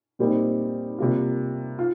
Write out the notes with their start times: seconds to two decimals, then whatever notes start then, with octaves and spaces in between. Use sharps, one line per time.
0.19 A#2 G3 C4 D#4
0.98 C3 G3 A#3 F4
1.79 F4